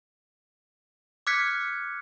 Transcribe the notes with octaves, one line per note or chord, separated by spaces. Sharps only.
D6 F6 F#6 G#6 B6 C#7